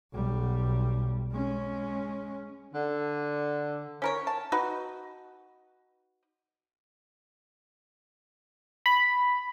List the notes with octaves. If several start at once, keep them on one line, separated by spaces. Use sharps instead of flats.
B1 G3
G#3 C#4
D3
C#4 A#4 C#5
A5
D#4 F#4 B4
B5